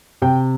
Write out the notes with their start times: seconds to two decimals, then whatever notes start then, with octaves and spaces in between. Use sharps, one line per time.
0.22 C3 G5